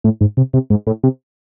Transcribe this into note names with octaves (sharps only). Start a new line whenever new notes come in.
A2
G#2
C3
C3
G#2
A2
C3